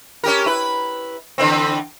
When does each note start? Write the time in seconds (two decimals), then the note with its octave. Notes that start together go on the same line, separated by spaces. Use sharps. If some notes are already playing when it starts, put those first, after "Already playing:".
0.24 C#4 G4 A#4
0.46 E4 B4
1.38 D3 E3 C4